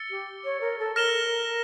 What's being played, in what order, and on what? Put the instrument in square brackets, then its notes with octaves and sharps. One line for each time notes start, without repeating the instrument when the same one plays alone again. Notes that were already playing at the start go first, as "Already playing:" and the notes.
Already playing: [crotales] E6 A6 C#7 G7
[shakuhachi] G4
C#5
A#4
A4
[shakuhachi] A#4 [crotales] F6 A#6 E7 G7